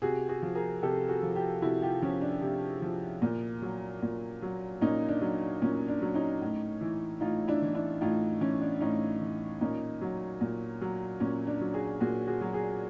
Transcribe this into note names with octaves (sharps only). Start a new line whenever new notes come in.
C3 F#4 G#4
F#4 G#4
F3
G#4 A#4
C3 G4 A4
F#4 G#4
F3
F4 G4
C3 E4 F#4
F4 G4
F3 C#4
D4
C3
F3
A#2
F#3
A#2
F#3
A#2 C#4 D#4
D4
F#3
A#2 C#4
D4
F#3
C#4 D#4
A2
E3
A2 D#4 F4
D4 E4
E3
D4 E4
A2 D#4 F4
E3 C#4
D4
A2 C#4 D#4
E3
A#2 C#4 D#4
F#3
A#2
F#3
A#2 C#4
D4
F#3
F#4 G#4
A#2 F#4 G#4
F#4 G#4
F#3
F#4 G#4